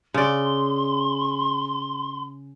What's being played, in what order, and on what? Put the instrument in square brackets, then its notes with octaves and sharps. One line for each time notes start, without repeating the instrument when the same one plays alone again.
[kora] C#3 D5 [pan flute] C6